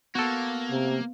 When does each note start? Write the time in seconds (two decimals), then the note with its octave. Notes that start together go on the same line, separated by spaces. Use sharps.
0.15 A#3 B3 F#4 A4
0.71 C3